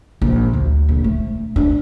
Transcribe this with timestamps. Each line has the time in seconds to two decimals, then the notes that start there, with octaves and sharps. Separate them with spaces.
0.22 A#1
0.53 D2
0.89 A#1
1.04 A3
1.56 D4